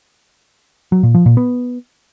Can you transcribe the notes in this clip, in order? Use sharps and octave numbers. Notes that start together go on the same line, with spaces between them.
F#3
A#2
F3
A#2
B3